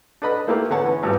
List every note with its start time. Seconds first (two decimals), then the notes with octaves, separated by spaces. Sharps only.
0.22 D4 A4 B4 D#5 A5 B5
0.47 A3 A#3 E4 F4 G4 A#4
0.70 D3 B3 C#5 F#5 A5
0.84 E3 B3 C#4
1.03 G#1 G2 F3 B3 G4